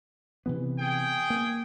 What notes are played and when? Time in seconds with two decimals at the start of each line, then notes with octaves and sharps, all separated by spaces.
0.46 C3 E3 B3
0.79 G#4 G5
1.30 A#3